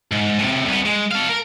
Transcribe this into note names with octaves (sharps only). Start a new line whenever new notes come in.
G#2
A2 C3
C2 B3
G#3
A4 F5
A#4